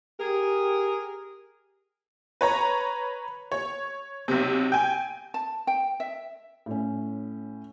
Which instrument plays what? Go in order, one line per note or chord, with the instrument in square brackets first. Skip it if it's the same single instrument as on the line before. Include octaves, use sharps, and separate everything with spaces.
[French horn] G4 [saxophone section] G#4 A#4
[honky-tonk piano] B4 C#5 A#5
C#5
B1 C3
G5 G#5
[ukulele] A5
G5
E5
[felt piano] A2 C#4